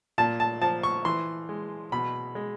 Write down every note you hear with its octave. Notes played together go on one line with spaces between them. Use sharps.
A#2 A5
A5
F3 A5
C#6
E3 C6
G#3
B2 B5
G#3